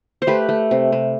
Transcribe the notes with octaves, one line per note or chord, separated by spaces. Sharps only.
C5
A3 G4 B4
A3
C3
C3